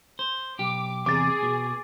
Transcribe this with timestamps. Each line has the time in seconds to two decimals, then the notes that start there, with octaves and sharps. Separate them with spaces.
0.19 C5
0.59 B1 G4 D6
1.06 E2 C3 G#4 D6 A6
1.43 B2